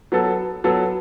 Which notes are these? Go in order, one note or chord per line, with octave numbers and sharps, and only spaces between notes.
F#3 B3 A4
F#3 B3 A4